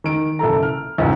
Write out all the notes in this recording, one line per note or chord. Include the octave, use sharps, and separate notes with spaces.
D#3 D7
F#1 E4 A4 A#5
F6
C#2 G#2